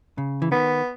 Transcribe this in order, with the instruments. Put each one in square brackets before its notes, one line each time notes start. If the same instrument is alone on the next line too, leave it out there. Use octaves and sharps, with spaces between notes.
[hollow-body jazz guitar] C#3
E3
[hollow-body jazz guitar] D#3 [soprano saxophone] B3